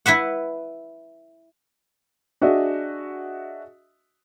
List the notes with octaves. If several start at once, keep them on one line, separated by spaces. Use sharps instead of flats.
E4 B4 E5 F#5
D4 F#4 G#4 D#5 E5